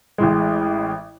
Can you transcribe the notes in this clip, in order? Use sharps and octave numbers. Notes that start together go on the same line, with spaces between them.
A1 A2 G#3